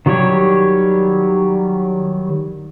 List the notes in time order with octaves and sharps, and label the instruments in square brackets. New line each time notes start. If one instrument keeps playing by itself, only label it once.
[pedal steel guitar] D#3 F#3 G3 G4 C#5